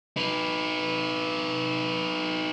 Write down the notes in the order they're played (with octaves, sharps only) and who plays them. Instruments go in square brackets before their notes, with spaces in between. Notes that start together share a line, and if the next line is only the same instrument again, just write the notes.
[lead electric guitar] D#4 B4